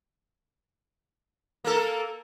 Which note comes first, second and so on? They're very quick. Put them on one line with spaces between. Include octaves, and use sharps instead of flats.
A#3 A4 A#4